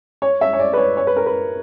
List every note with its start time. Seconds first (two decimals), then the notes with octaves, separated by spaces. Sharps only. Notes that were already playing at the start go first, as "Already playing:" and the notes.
0.22 C#5
0.41 E5
0.53 C#5
0.59 D5
0.73 B4
0.78 C#5
0.97 C#5
1.07 B4
1.16 A#4
1.26 B4